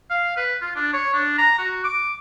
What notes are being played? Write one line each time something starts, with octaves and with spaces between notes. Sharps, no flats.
F5
B4
F4
D4
C#5
D4
A#5
F#4
D6